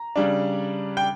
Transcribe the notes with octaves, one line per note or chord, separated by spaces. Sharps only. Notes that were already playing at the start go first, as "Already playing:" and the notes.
Already playing: A#5
C#3 G3 D4
G5